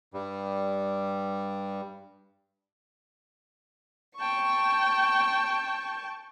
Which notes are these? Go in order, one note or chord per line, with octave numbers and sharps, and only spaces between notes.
G2 G3
G5 A5 C#6